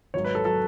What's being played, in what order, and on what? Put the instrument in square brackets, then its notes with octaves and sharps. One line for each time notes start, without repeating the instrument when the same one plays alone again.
[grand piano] G#1 G#2 F#3 C#5
B4
A4
F#3 A4